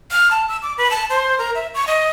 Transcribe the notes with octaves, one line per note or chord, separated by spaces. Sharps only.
F6
A5
E6
D6
B4
A5
C5
A#4
E5
C#6
D#5